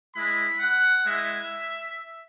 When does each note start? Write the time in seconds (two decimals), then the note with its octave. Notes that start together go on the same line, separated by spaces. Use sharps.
0.14 G#3 E4 B5
0.59 F#5
1.06 G#3 E4 E5